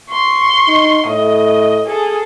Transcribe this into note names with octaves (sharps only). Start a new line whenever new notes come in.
C6 C#6
D#4
A2 D#5
G#4 A4